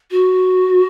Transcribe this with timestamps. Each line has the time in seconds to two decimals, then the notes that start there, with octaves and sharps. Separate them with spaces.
0.11 F#4